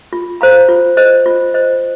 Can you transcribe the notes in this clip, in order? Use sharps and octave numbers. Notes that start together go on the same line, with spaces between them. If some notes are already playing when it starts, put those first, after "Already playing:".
F4
C5 F5 A#5
F4
C5 D#5
F4
C5 D#5